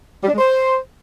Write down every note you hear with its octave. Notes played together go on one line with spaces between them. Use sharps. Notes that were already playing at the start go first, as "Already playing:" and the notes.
G3
D4
G#3
C5